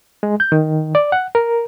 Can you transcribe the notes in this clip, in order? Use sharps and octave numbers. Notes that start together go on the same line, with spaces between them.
G#3
G6
D#3
D5
F#5
A#4